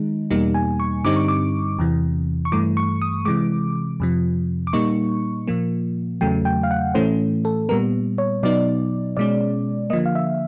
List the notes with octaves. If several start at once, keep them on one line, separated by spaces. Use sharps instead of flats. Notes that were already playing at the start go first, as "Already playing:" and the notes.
Already playing: D#3 G#3 D#4
E2 B2 G3 A#3 D#4
G#5
C#6
G2 D3 G3 C4 D#4 D6
C#6
D6
E2 C3 E3
C#6
G2 E3 A3 D6
C#6
D#6
C3 E3 G#3 D6
F2 C3 F3
D6
A#2 G3 A#3 D#4 C#6
A#2 F3 A#3
E2 C#3 F#3 A3 G5
G5
F5
F#5
A2 E3 A3 C#4 C5
A4
A#2 G3 B3 A#4
C#5
B2 F#3 B3 D#4 D5
B2 G#3 C#4 D5
D3 F3 A#3 D#5
F5
E5